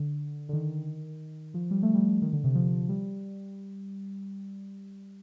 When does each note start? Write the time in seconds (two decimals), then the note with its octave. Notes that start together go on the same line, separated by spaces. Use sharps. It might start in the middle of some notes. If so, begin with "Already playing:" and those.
Already playing: D3
0.49 D3
0.53 D#3
1.54 F3
1.71 G3
1.83 A3
1.95 G3
2.22 D#3
2.33 D3
2.44 C3
2.55 F3
2.89 G3